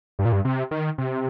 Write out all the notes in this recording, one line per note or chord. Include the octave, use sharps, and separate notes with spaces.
G2
A#2
G2
C3
D#3
C3